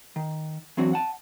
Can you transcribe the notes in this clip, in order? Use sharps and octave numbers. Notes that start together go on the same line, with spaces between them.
D#3
E3 F#3 C4 D4 F#4
F#5 A5